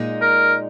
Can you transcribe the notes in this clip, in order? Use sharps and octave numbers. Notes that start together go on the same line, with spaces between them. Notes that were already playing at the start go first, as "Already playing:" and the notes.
Already playing: A#2 G#3 D#4
A#4